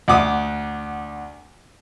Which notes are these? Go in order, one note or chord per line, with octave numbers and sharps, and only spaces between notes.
D2 F#5 D6 D#6